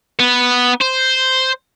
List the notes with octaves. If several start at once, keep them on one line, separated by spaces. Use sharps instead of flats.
B3
C5